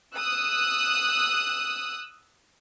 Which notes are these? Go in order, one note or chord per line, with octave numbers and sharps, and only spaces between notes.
D#6 E6 F#6